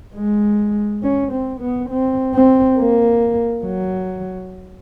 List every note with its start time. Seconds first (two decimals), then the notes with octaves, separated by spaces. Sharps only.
0.16 G#3
1.03 C#4
1.32 C4
1.61 B3
1.90 C4
2.34 C4
2.78 A#3
3.65 F#3